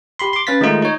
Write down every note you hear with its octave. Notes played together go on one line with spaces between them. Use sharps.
G4 B5 C6
C6 D6
C#4 B4 F5 A6 B6
D#3 G#3 A3 D#4 F4
D#4 C#5